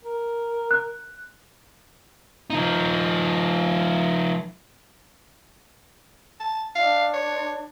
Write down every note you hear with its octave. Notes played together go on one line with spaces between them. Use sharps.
A#4
F#6
F3 D#4
A5
D4 F5
C#5